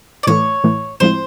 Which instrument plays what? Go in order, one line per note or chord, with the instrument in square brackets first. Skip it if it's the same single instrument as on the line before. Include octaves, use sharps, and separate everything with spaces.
[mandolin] D5
[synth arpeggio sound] A2 E3 A3 [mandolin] C#5
[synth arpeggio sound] A2 E3 A3
[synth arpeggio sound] A2 F3 G#3 C4 E4 [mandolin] C5